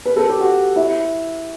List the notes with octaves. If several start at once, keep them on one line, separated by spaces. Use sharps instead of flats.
B4
A4
G4
F#4
E4